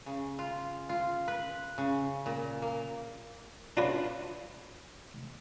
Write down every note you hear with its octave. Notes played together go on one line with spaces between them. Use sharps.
C#3
F4
F4
B4
C#3
A#2
A#3
C#4 D4 F4 F#4 B4 C#5